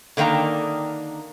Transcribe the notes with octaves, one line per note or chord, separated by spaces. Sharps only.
D3 D#3 A#3 G5 A#5